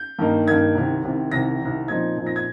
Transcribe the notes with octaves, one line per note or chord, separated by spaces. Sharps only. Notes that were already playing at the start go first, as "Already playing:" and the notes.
Already playing: G6
G2 D#3 A#3 D#4
G2 D#3 A#3 D#4 G#6
C2 C3 D#3
C2 C3 D#3
C2 C3 D#3 A#6
C2 C3 D#3
A#2 F3 C4 D#4 G#6
A#2 F3 C4 D#4
A#6
G#6